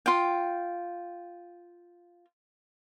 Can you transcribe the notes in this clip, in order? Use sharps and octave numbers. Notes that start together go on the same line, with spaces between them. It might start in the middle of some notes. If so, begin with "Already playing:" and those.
F4 G5